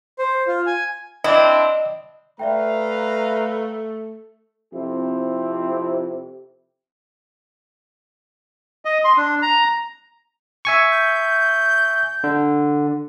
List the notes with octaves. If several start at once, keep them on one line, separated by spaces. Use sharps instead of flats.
C5
F4
G#5
C4 D4 E4 D5 D#5
A3 B4 D5 E5 F5 G5 A#5
F2 C3 C4 E4 G4
D#5
C6
D4
A#5
E5 G#5 C#6
G6
D3